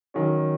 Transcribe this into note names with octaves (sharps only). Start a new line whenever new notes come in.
D#3 F#3 C#4